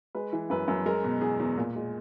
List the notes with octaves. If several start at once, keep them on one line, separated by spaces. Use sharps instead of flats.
G#3 B4
E3
F#2 B4
F#2
G#3 A#4
B2
E2 G#4
E2
A#2
G#3